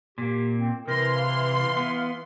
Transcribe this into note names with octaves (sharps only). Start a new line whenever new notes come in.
A#2 A#3 G4
C4
C3 E3 A#4 C6
F5
B3